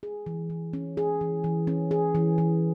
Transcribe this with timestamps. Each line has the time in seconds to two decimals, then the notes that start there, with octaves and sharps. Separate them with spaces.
0.03 G#4
0.26 E3
0.50 E3
0.73 C#4
0.97 G#4
1.21 E3
1.44 E3
1.67 C#4
1.91 G#4
2.15 E3
2.38 E3